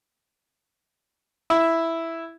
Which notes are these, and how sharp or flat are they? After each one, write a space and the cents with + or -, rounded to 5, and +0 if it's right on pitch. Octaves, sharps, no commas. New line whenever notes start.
E4 +0 E5 +0